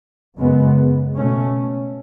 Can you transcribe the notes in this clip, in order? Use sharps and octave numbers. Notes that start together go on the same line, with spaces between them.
F#2 C#3 G#3 B3
B2 A3 C#4